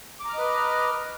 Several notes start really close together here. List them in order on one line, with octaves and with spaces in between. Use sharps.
D6 A#5 F6 D#5 B4